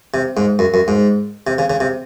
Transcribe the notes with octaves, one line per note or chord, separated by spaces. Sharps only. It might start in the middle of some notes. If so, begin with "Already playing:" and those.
C3
G#2
F#2
F#2
G#2
C3
C#3
C#3
C3